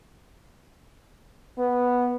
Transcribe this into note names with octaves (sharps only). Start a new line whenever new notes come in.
B3